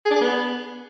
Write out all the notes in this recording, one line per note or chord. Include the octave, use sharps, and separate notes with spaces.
G#4
D4
G#4
B3